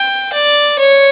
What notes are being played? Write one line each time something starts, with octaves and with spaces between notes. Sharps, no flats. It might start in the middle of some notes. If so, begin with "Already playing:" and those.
Already playing: G5
D5
C#5